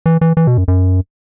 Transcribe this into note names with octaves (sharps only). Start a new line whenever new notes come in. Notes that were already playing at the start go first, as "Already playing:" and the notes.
E3
E3
E3
B2
F#2
F#2